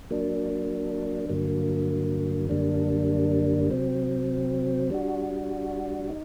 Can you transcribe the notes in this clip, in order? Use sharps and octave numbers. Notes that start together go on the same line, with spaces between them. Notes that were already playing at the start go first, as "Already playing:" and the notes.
F#3 A#3 D4
G2 D3 F#3 A#3
F#2 D3 G3 A#3 D4
C3 F#3 C4
G3 D4 F#4
D#4